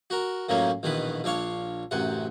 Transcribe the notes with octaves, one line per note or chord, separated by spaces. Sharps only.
F#4 A#4
F#2 A2 F3 F#3 A#3 C#4
A#1 B2 D#3 E3 B4
A#1 D4 C#5 F5
A1 F#2 C3 F#5